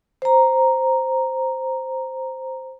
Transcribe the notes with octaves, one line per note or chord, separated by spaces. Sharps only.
C5 A#5